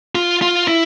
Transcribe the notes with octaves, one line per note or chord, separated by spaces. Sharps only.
F4
F4
E4